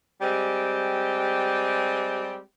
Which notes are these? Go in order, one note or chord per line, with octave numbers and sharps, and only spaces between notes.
G3 G#3 C4 G4